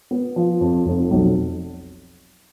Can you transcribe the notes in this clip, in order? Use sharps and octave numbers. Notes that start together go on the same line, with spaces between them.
B3
F3
F2
F1
B1